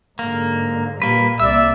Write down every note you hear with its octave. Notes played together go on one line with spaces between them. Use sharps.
G#2 D3 A#3
A#2 G3 A#3 B4
C2 A#3 D5 E5 E6